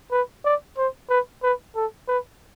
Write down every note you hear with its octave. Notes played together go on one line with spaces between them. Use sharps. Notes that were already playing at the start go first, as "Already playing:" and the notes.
B4
D5
C5
B4
B4
A4
B4